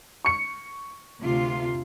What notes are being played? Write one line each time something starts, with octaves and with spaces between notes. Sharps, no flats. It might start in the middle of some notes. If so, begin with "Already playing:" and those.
C#6 C#7
D2 C3 F4